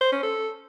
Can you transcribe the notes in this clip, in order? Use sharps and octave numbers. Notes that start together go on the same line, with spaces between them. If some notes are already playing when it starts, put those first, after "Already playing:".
C5
C#4
A4